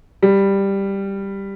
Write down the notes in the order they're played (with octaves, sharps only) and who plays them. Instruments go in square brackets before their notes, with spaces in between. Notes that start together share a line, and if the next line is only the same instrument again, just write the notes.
[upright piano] G3